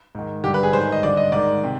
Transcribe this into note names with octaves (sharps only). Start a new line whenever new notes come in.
G#2 D#3
G2 D3 G4
B4
G#4
G#2 D#3 C5
D#5
G2 D3 D5
D#5
G#2 D#3 D5
C3